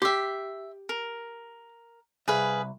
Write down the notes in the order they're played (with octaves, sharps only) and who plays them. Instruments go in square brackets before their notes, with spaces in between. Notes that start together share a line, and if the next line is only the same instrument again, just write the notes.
[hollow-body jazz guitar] G4 [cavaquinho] E5 C6
[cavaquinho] A#4
[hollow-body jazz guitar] C2 [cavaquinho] G#4 B4 F5